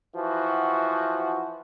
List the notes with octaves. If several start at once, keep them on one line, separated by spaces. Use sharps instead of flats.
E3 F3 F#4